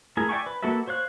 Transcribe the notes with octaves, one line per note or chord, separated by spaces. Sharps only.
A3 E4 G#4 A#4 G#5
D5 E5 G5 G#5 C#6
B4
A#3 F#4 A4 B4 E5
C5 C#5 F5 F#6